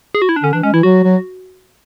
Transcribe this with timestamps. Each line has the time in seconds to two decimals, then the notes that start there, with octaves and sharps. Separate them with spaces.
0.15 G#4
0.22 F#4
0.29 E4
0.36 D4
0.43 D3 C#4
0.53 E3 D4
0.63 G#3 C#4
0.73 E3 E4
0.83 F#3 F#4
1.03 F#3